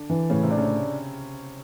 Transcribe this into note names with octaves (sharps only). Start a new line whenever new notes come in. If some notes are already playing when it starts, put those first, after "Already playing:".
Already playing: D3 D4
E3
A2 C#3 C#4
C3 C4
D4
C#3 C#4